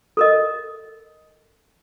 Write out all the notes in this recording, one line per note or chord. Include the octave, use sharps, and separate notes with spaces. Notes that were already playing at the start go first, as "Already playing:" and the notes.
A4 A#4 D#5